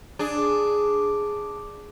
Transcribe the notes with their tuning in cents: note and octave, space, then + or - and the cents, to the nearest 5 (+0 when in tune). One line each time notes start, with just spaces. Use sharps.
D4 +0 G#4 +0